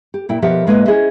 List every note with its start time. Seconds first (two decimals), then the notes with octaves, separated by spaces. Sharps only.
0.14 G4
0.29 A#2 E4 G5
0.42 B2 F3 G4 A#4 E5 F#5
0.67 A2 G#3 A#3 B4 C5 D#5
0.86 C#4 E4 G#4 C5 D#5 E5